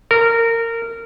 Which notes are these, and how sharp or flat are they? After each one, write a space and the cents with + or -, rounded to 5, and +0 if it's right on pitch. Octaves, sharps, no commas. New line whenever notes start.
A#4 -20